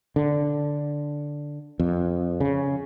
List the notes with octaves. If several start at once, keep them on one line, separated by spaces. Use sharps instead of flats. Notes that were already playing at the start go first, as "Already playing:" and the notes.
D3
F2
C#3